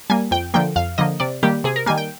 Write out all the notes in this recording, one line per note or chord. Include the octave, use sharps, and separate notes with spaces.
G3 A#3 G#5
F2 G5
D3 F3 A#3 G5
F2 F5
D3 F3 A#3 D#5
C3 D5
D#3 G3 A#3 G4
C3 G#4
A#4
D#3 G3 A#3 G#5
G5